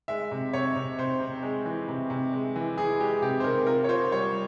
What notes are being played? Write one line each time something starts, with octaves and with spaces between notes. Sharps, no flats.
G#3 E5
C3
C3 C#5
C3
C3 C5
C3
G#3
E3
C3
C3
G#3
E3
E3 G#4
G#3 G4
C3 G4
C5
C3 A#4
F4 A#4
C#5
F4 C5
G3 C#5